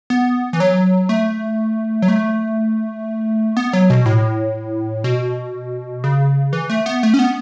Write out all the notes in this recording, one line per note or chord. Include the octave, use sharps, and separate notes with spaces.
B3
E3
F#3
A3
F#3
A3
B3
F#3
B2
A2
B2
C#3
E3
A3
B3
A3
C#4
B3